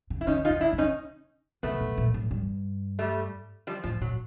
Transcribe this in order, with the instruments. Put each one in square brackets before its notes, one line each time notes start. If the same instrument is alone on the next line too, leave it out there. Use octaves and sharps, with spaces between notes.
[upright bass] C#3
[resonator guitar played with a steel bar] E4
[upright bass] D3 [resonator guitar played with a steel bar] C#4 D#4
[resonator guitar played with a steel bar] D#4 F4
[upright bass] D3
[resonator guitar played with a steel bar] D4 E4
[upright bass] C#3
[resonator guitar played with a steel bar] C#4 D#4
[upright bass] C3 [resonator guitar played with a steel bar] A3 B3
[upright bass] B2
A#2
A2
G2
[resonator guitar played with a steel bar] G3 A3
F3 G3
[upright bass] A2 [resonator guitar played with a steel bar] F3
[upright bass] A#2 [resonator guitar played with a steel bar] F#3